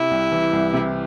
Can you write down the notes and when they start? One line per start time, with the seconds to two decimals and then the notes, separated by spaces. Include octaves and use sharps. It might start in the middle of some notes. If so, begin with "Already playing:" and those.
Already playing: C3 E4
0.11 C2
0.32 E3
0.53 C2
0.73 C3